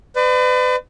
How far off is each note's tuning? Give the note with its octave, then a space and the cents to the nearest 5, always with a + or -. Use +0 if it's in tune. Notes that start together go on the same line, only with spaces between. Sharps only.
B4 +40 D5 +35